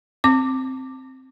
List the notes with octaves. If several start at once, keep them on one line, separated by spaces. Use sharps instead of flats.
C4 D6